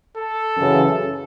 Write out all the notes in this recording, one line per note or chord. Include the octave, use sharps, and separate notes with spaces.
A4
F#2 C#3 E3